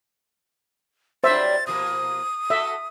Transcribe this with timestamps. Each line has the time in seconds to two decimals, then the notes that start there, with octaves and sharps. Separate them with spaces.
1.24 F#3 G3 D4 C5 E5 A6
1.67 B2 F3 A#3 D#6
2.50 A3 F#4 A4 E5